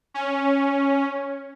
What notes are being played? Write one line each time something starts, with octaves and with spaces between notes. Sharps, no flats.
C#4